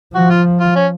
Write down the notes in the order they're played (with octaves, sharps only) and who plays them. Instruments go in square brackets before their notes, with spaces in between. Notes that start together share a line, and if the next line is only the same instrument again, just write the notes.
[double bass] F3 [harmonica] F#4
[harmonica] F4
F4
C#4